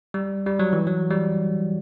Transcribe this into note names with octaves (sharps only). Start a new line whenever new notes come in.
G3
G3
F#3
E3
F#3
G3